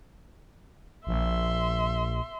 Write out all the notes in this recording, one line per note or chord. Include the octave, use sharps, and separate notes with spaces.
A#1 E5 C6